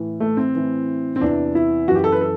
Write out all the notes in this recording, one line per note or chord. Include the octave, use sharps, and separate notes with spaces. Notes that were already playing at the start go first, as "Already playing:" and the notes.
Already playing: A2 E3
A3
C4
A2 E3
C4
E2 C3 E3 D4
E4
F#2 E3 F#4
G4
A4
B4
A4